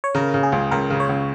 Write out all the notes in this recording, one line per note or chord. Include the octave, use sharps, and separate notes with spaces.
C#5
C#3 A#4
C#3
G#4
C#2
C#2 A#4
C#3
C#5
C#2